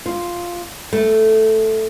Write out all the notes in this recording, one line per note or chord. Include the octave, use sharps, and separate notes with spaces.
F4
A3